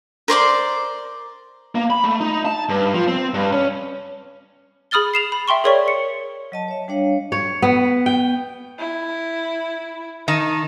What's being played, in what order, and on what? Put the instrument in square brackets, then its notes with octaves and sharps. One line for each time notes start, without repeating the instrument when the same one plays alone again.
[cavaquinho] A#4 C5 D5 C6
[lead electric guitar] A#3
B5
A3
D#4
A5
G2
F3
C4
G2
C#4
[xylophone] G#4 B5 D#6 F6 A6 G7
C7 E7 F7
B5
E5 G5 C6 C#6
G#4 A#4 C#5 D5 C#6 B6
C#7
[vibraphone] F#3 D#5 A5
C#5 E5
G3 D4 C#5 F5
[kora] C#5
B3
G5
[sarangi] E4
[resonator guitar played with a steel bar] D#3 D#4 [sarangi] A5